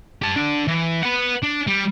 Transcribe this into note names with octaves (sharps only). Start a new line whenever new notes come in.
G4 A5
D3 D4
E3
B4 F#5
D4
G3